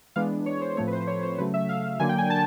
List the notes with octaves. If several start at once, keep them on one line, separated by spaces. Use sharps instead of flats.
E3 G#3 B3 D4 F5
C#5
C5
A2 F3 A3 C4 C#5
B4
C5
C#5
C5
C#3 F#3 A3 B4
E5
F5
D3 F#3 A#3 D4 G#5
G5
G#5
A5